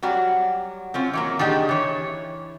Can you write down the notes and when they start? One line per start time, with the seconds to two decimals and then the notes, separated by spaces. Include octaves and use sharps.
0.03 F#3 G3 F#4 D5
0.94 C4 C#4 F4
1.13 E3 F#3 A#3
1.39 D#3 D4 G4 G#4
1.69 E3 C#5